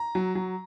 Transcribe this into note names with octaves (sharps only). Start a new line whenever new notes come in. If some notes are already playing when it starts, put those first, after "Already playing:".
Already playing: A#5
F#3
F#3